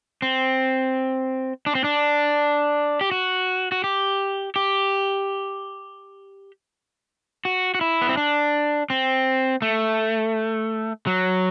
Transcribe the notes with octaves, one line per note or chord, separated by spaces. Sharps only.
C4
D4
C4
D4
G4
F#4
F#4
G4
G4
F#4
F#4
E4
B3
C4
D4
C4
A3
F#3